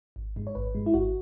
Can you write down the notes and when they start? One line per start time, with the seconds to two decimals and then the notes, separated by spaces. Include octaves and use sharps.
0.16 G#1
0.36 G#2 G#3
0.47 C#5
0.55 G#1 B4
0.75 G#2 G#3
0.86 E4
0.94 G#1 F#4